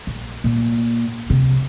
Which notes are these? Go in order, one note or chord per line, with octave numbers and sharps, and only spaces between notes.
A#1
A#2
C3